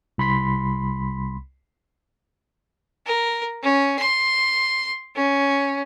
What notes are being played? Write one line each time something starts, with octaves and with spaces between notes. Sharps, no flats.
C2 B5 C6 B6
A#4
C#4
C6
C#4